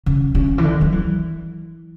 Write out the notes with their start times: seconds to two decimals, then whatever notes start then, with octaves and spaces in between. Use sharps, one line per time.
0.06 C#3
0.35 C#3
0.58 E3
0.64 D3
0.81 F#3
0.92 E3